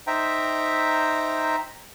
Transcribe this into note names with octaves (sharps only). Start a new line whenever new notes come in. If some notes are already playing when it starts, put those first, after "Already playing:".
D#4 C5 E5 G5 A#5